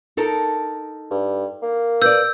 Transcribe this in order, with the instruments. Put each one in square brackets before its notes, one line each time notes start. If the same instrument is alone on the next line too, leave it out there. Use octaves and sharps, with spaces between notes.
[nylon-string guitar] D#4 A4 A#4
[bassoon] G2
A#3
[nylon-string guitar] B4 D5 [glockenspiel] E6 G6